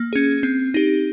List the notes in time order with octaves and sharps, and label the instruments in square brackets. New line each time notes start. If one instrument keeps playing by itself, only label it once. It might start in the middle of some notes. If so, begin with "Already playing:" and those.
Already playing: [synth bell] A#3
C#4 G#4
C4
D#4 G4